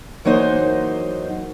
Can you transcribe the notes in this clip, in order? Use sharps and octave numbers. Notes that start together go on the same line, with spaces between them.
E3 F#3 A#3 D#4 C5